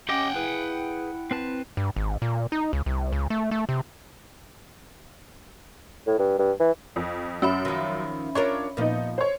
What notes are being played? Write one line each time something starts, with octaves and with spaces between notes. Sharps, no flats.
C#4 G4 D#5 F#5 G5 D6
E4 G#4 B4
C4 B4 A5
G2
G#1
A#2
D#4
C#2
C2
C#2
A3
A3
C3
A2
G2
G2
E3
F2
F#2 C#4 E5 B5
D#3 F3
D4 F4 A#4 C#5
A#2 F3 B3 D#4
C5 C#5